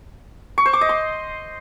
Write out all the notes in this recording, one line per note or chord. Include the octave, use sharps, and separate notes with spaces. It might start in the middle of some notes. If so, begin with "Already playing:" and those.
C#6
C5
D6
D#5
C6